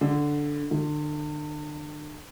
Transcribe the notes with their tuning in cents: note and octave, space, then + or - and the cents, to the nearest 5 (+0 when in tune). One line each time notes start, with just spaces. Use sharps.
D3 +0
D3 +35